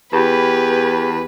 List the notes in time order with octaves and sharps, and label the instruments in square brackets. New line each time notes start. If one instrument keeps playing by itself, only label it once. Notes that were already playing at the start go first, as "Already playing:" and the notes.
[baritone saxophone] E2 [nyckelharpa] G4 [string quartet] B4